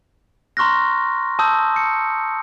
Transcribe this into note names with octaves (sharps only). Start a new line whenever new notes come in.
A#5 C6 C#6 F6 F#6 A#6
A5 D#6 E6 G6
C#7